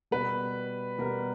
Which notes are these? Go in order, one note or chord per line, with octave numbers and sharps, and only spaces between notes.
B2 G3 B4
B2 G3 A#4